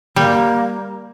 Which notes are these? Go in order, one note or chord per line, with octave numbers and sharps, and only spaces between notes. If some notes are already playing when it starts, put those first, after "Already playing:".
G3 A#3